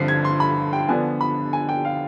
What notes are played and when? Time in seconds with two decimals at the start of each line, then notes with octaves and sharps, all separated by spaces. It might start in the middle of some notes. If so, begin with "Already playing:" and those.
Already playing: G2 D3 F3 C4 B6 C7
0.08 G#6
0.25 C6
0.40 B5
0.73 G5
0.89 D3 F3 B3 D4 G#5
1.21 B5
1.53 G#5
1.69 G5
1.85 F5